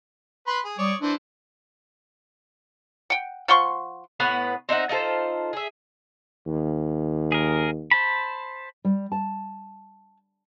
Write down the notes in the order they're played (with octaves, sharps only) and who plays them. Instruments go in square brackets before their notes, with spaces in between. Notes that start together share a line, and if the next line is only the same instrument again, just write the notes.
[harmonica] B4 B5 C6
G#4
[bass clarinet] G3 [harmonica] C#5 D5 D#6
[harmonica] E3 C5 [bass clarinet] D4
[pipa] F#5 G5
F3 F#5 C6 C#6
[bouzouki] A2 B3 B4 F#5
C4 D#4 E5 F#5
D#4 F4 A4 C5
G#4 E5
[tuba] D#2
[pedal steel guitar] G#4 A#4
C5 A5 B5
[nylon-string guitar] G3
A5